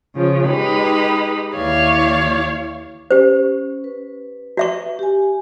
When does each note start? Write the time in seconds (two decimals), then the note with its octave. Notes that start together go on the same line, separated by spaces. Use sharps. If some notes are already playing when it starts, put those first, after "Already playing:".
0.16 C#3 F3
0.47 G#3 D#4 G4 B4
1.56 D#2 E3 C#5 D5 F5
3.10 C#4 G4 C5
3.84 B4
4.57 F#4 E5 C#6
4.99 G4 G#5